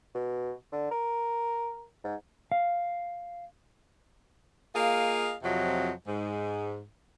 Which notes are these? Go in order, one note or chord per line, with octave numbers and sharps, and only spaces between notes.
B2
D3
A#4
G#2
F5
A#3 F4 G#4 D#5 F5
F2 C3 F3 F#3 D#5
G#2